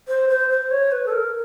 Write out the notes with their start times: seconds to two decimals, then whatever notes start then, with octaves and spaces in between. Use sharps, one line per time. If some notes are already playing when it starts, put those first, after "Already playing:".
0.08 C5
0.29 C5
0.50 C5
0.71 C#5
0.92 B4
1.06 A4
1.12 A#4